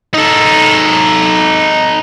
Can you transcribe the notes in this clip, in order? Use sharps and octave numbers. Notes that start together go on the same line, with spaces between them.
D#4 A4